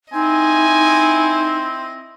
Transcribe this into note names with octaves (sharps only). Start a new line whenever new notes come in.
C4 D#4 E4 D#5 G#5